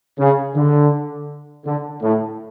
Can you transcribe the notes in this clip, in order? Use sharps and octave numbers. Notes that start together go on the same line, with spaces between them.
C#3
D3
D3
A2